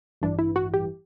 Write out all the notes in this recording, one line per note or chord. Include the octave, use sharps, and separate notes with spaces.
A1 G2 E3 D4
E4
F#4
G4